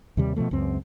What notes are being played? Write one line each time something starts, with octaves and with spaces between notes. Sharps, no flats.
D#2 C3 G3
B2 D3 F3 A3
C#2 F#2 C4